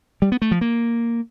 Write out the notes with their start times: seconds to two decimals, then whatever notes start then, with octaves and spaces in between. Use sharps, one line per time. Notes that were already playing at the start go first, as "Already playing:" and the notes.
0.22 G3
0.32 B3
0.42 A3
0.51 F3
0.61 A#3